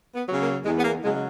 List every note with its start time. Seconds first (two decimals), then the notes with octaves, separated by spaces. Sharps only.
0.15 B3
0.27 C#3 F#3
0.41 A#3
0.65 E2 G#3
0.78 B3
0.84 A#3
1.03 C#3 F#3 G#3
1.14 G#3